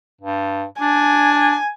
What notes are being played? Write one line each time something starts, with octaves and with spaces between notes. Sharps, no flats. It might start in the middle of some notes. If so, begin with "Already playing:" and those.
G2
D4 G#5